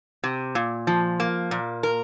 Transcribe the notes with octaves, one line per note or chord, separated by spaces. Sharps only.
C3
A#2
F3
A#3
A#2
A#4